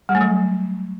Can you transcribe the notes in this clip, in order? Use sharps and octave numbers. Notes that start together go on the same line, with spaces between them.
G3
A3
F#3